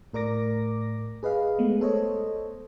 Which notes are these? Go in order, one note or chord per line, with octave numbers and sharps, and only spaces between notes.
A2 A#4 D5 D6 A#6
G#4 B4 D#5 F5
G#3 A3 B3
A4 C5 C#5 D#5